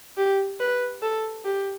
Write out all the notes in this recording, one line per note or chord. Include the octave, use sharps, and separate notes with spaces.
G4
B4
A4
G4